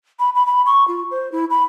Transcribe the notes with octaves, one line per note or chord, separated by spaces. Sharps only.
B5
B5
B5
C#6
F4
C5
E4
B5